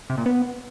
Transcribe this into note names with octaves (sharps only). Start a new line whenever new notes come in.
C3
A#2
B3